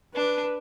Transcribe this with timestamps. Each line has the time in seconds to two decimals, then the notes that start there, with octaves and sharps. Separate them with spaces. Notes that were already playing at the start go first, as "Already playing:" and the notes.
0.15 D4 B4